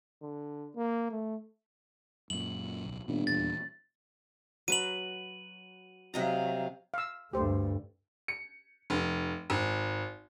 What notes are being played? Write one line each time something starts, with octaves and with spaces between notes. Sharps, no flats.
D3
A#3
A3
F#2 A#2 F#7
D1 B1
G1 A#2 D#3
D#1 E2 A#2 A6
F#3 B4 D#7 F#7
C3 F#3 D#5 F5 A#5
F5 E6
D2 G2 A3 G4 C5
C#7
F1
G#1